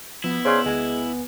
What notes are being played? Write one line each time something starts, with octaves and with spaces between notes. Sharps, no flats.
F3 B3 E4
C#3 C5 D5 C6
D2 G#3 G#5